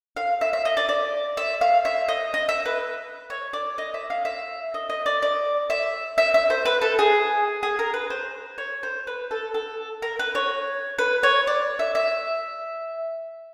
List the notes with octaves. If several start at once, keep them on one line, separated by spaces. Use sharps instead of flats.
F5
E5
E5
D#5
D5
D5
E5
F5
E5
D#5
D#5
E5
B4
C#5
D5
D#5
E5
F5
E5
D#5
D#5
D5
D5
E5
E5
E5
C5
B4
A4
G#4
G#4
A#4
B4
C5
C#5
C5
B4
A4
A4
A#4
B4
C#5
B4
C#5
D5
E5
E5